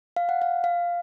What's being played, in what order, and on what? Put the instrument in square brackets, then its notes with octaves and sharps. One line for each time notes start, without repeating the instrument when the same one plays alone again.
[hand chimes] F5
F#5
F5
F5